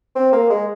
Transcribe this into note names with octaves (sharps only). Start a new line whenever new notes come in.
C4
A#3
G#3